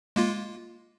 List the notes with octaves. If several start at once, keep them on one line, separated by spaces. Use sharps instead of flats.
G#3 A#3 F4